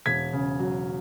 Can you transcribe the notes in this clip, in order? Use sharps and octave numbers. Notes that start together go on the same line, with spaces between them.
E1 G#6 B6
C#3
F#3